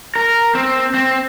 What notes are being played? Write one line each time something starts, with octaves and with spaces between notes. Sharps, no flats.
A#4
C4
C4